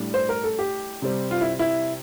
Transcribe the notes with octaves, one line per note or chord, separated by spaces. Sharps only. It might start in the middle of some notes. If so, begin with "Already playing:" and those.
Already playing: A2 G3 D4
C5
A#4
A4
G4
C3 G3 C4
F4
E4
E4